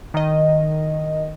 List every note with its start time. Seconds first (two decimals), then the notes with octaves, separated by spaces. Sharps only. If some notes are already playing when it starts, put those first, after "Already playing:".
0.14 D#3 D#5